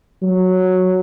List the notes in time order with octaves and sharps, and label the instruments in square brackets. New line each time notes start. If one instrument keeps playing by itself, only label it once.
[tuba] F#3